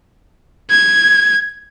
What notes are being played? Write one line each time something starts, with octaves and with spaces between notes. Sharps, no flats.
G#6